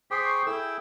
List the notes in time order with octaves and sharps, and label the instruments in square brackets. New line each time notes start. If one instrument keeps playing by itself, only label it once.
[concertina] G#4 C5 G5 [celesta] D6 D#6 C7 [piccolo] B6
[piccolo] C#6
[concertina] E4 G#4 E6 [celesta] A4 [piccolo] G5